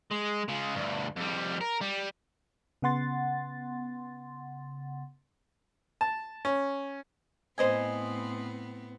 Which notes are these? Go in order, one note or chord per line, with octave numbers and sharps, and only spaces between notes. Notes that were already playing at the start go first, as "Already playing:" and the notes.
G#3
C#3 G#3
D2 G2
F2 G3
A#4
G3
C#3 B3 F#5 C6 A6
A5
C#4
A2 B3 C4 C5 D#5 G#5